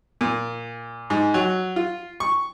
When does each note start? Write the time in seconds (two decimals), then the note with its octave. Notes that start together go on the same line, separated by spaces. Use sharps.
0.21 A#2
1.10 G#2
1.34 F#3
1.76 F4
2.20 C#6